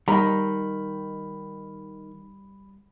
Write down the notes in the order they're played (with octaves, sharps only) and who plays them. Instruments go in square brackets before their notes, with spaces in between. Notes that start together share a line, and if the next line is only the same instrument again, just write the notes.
[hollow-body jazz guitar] D#3 [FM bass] G3 [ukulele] D#5 A#5 [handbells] B5